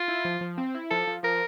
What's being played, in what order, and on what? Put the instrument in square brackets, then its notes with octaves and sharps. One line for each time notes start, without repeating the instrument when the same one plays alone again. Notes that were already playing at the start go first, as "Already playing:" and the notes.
Already playing: [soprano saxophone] F4
[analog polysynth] E4
F3
F3
C4
E4
[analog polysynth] F3 [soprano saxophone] A4
[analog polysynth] F3
[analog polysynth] F3 [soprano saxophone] A#4